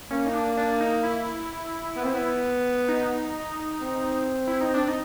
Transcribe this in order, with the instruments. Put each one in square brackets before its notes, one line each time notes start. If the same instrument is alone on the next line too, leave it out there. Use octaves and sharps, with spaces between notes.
[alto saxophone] A#3 [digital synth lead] C#4
[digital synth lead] D#4
D4
D4
D#4
E4
[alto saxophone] B3
C4
B3
[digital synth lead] D#4
[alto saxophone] C4
[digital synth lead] E4
D#4
D4
D#4